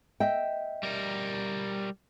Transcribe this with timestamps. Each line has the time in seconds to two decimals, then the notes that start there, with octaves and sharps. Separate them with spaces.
0.20 D#5 E5 G5
0.83 G3 A#4